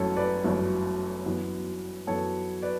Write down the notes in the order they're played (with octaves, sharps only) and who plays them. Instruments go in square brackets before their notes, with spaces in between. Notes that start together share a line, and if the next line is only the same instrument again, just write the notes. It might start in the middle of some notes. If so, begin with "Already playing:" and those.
Already playing: [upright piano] G1 F#2 E3 A3 C#4 A4 C#5
B4 D5
G1 F#2 E3 A3 C#4
F#2 E3 B3
F#2 E3 B3 A4 C#5
B4 D5